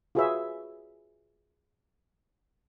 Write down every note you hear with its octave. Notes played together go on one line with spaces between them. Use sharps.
F4 F#4 G#4 B4 C#5 E5